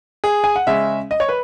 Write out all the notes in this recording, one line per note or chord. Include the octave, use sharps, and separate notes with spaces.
G#4
G#5
F#5
C#3 G#3 C#4 E5
D#5
C#5
B4